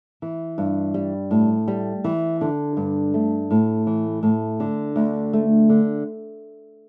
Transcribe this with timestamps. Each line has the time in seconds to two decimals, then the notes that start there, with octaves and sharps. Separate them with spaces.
0.22 E3
0.58 G2
0.94 G3
1.31 A2
1.68 G3
2.04 E3
2.41 D3
2.77 G2
3.14 A3
3.51 A2
3.87 E3
4.23 A2
4.60 D3
4.96 D2
5.33 A3
5.69 D3